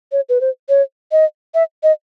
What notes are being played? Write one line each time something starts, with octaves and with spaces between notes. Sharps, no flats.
C#5
B4
C5
C#5
D#5
E5
D#5